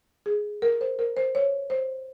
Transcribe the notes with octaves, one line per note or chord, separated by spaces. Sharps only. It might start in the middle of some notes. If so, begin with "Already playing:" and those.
G#4
A#4
C5
A#4
C5
C#5
C5